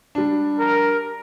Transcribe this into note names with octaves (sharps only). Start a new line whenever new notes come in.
G3 D4
A#4